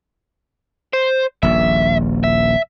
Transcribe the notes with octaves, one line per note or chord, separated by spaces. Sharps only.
C5
D#1 A#1 E5
E5